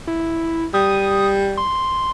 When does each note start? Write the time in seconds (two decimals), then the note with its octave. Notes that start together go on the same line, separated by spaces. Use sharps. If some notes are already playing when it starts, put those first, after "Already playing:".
0.07 E4
0.74 G3 D#6
1.57 C6